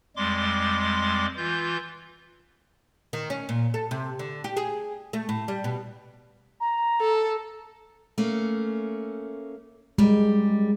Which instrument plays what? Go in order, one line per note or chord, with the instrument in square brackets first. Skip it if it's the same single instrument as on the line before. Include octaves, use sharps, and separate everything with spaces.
[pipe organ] F2 G3 G#3 C6 D6
E3 F4 G6
[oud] D#3
C#4
A#2
A4
C3
D3
G4
G#4
A3
A2
G3
B2
[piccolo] A#5
[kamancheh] A4
[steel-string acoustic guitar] A3 A#3 C#4
[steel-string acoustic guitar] F#2 G3 [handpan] G#3